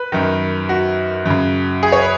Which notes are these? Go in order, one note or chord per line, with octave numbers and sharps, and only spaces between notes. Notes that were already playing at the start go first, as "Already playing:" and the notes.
Already playing: B4
F#2 D#3
F#4
F#2 C#3
G#4
C#5
B4